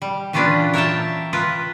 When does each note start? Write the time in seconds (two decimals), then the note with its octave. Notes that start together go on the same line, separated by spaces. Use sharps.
0.02 G3
0.33 A#2 E3 C#4 D4 F4 B4
0.74 A#4 C#5 E5 G5 A5
1.33 F4 A#4 B4